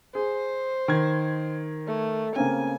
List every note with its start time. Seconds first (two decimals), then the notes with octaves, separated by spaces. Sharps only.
0.15 G#4 C5
0.88 D#3 G#6
1.87 A3
2.36 C#3 A#3 C4 G#5